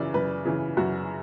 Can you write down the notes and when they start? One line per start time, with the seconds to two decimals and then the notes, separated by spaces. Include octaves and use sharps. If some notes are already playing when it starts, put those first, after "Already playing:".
Already playing: F#2 C#3 E3 D5
0.14 F#2 B4
0.45 C#3 E3
0.77 F#2 F#4